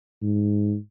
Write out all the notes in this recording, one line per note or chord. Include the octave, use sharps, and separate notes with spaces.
G#2